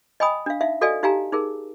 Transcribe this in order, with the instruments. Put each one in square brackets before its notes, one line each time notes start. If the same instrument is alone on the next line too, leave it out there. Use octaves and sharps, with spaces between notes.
[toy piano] D#5 G5 G#5 B5 D#6
D4 F5
D#4 E5 F5
F#4 A4 D5 D#5 F5 G#5
D#4 G4 F5 G#5 A#5
D#4 G#4 A#4